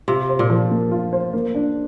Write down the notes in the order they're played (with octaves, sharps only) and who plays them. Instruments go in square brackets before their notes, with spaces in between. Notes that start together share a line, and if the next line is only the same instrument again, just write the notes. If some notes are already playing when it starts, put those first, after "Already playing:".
[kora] C3 [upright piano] F4
[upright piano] C5
[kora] A#2
[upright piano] F3
A#3
F4
C5
A#3
D4